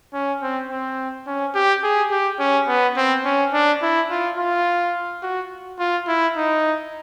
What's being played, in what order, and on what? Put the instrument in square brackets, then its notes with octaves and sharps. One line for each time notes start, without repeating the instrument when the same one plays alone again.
[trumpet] C#4
C4
C4
C#4
G4
G#4
G4
C#4
B3
C4
C#4
D4
E4
F4
F4
F#4
F4
E4
D#4